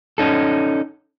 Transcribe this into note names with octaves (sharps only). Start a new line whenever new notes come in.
C#4 D#4 A4